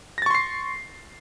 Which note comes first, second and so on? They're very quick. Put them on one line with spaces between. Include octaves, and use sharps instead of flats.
A#6 A6 C#6 C6 C7